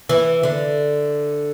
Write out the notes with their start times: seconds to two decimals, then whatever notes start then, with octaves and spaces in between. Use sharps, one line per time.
0.09 E3
0.43 D3